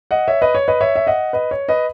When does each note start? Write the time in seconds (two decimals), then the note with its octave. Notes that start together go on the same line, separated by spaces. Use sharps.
0.11 D#5 F#5
0.28 C#5 E5
0.42 B4 D#5
0.55 C#5
0.68 B4 D#5
0.81 C#5 E5
0.96 E5
1.07 D#5 F#5
1.33 B4 D#5
1.51 C#5
1.69 B4 D#5